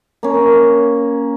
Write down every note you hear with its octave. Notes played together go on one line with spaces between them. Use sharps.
A#3 C#4